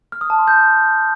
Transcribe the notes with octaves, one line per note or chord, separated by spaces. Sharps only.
F6
D#6
A5
C6
G6